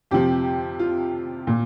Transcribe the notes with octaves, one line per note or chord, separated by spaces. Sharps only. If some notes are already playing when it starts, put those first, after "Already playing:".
F2 C3 F3 G4
F4
A#2